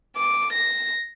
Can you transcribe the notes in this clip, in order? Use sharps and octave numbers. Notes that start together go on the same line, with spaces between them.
D6
A#6